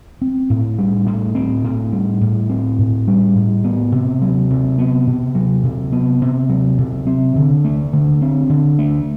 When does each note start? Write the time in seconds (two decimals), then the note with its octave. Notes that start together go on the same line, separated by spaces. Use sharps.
0.22 C4
0.50 A2
0.78 G3
1.06 A2
1.35 C4
1.64 A2
1.93 G3
2.21 A2
2.49 C4
2.79 A2
3.07 G3
3.35 A2
3.65 B3
3.92 C3
4.22 F#3
4.50 C3
4.79 B3
5.07 C3
5.35 F#3
5.64 C3
5.93 B3
6.22 C3
6.49 F#3
6.79 C3
7.07 C4
7.36 D3
7.65 A3
7.93 D3
8.22 C4
8.50 D3
8.79 A3